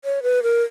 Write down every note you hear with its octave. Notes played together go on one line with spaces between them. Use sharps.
C#5
B4
A#4